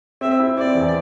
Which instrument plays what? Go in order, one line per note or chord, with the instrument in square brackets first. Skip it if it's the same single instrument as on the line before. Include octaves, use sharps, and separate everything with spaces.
[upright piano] C4 [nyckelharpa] E5
[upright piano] E4
[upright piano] C4 [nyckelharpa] D5
[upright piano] E2